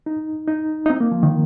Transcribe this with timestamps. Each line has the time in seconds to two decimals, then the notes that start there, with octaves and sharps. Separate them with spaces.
0.06 D#4
0.48 D#4
0.86 D#4
0.90 C4
1.00 A#3
1.12 F3
1.23 D#3